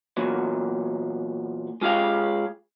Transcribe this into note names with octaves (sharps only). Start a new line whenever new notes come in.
E2 A#2 F#3
G#3 F4 G4 G#4 F5